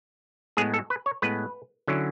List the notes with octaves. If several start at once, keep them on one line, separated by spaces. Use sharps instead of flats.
A2 G#3 B3 G#4
A4
B4
C#5
A2 G#3 B3 B4
D3 F#3 C#4 E4